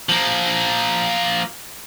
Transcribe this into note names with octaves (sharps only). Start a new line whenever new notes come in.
F3 A#3